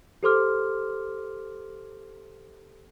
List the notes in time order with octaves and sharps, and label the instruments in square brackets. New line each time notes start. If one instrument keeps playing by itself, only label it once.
[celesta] G4 A4 C5 C6 D6 F6